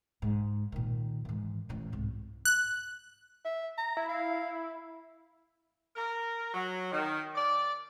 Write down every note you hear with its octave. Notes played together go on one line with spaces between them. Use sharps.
G#2
A#2 D#3
G#2 E3
A1 A2
C2 G#2
F#6
E5
A#5
E4
F5
A#4
F#3
D#3
D5